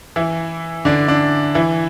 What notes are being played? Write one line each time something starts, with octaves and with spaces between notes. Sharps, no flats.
E3 E4
D3 D4
D3 D4
E3 E4